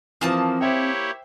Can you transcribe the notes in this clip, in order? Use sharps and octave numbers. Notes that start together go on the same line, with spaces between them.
E3 F3 A#3 C4 A5 D#6
E4 G4 C5 C#5 E5 G5